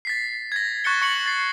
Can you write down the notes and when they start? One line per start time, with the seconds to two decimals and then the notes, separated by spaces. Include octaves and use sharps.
0.05 A6 B6 C7
0.52 G#6 A#6
0.84 C#6 F#6 A6 C#7 G7
1.02 C#6 C#7 F#7
1.26 A6 C7